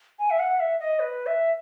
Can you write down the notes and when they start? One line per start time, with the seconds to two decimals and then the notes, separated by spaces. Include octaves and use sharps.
0.19 G#5
0.30 E5
0.39 F#5
0.60 E5
0.80 D#5
1.00 B4
1.26 E5